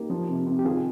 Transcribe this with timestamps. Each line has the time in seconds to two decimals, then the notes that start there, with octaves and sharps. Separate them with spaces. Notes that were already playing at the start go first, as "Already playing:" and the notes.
Already playing: A#3 D#4 G4
0.10 F3
0.28 C3
0.47 C3
0.59 G4
0.65 D#3 F4 G#4